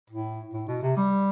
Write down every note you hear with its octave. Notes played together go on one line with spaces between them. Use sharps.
A2
A2
B2
C3
G3